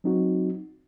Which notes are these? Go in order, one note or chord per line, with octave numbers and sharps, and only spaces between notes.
F#3 C4 D#4 F#4